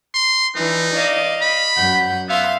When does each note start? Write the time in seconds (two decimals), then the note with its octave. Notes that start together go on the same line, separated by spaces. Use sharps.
0.14 C6
0.56 E3 D4 D#4
0.94 D5 D#5 F5
1.42 B5
1.76 F#2 F#5 G6
2.28 B3 E5 F5 C6